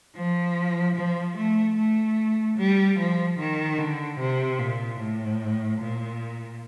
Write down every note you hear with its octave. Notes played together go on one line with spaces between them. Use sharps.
F3
F3
A3
A3
G3
F3
D#3
D3
C3
A#2
A2
A#2